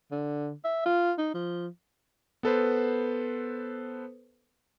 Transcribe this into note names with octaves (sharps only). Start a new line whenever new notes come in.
D3
E5
F4
D#4
F3
B3 A4 B4 C5